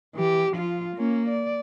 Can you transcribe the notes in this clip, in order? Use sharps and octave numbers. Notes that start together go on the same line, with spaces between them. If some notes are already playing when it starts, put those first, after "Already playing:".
E3 G4
F3 F4
A#3 C#4
D5